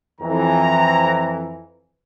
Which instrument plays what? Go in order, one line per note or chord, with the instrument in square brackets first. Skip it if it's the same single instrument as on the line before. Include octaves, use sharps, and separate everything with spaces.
[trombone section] F2 E3 [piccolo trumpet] A#5